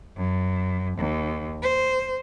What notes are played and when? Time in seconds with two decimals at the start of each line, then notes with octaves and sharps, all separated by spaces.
0.17 F#2
0.98 D#2
1.62 C5